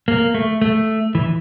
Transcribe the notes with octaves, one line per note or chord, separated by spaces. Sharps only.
A#3
A3
A3
E3